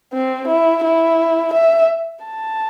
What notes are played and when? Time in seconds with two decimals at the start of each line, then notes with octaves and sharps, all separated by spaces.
0.13 C4
0.47 E4
0.84 E4
1.53 E5
2.25 A5